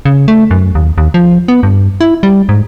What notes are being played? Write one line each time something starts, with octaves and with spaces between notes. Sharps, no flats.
C#3
A3
F#2
D#2
D#2
F3
B3
G2
E4
G3
G#2